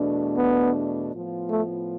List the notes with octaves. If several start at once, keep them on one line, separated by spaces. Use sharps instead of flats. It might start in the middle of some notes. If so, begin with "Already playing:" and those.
Already playing: E2 B2 A3 D4
B3
A2 F3 B3 F4
A3